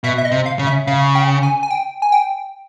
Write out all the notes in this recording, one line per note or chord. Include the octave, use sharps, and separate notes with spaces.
B2 E5
E5
D#5
C3
F5
C#3
E5
C#3 F5
G5
G#5
G#5
G5
G#5
G5